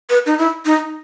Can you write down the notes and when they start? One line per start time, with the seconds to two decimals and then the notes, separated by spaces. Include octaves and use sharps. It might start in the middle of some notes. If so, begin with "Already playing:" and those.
0.10 B4
0.26 D#4
0.38 E4
0.66 D#4